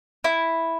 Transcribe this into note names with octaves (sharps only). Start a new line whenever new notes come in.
E4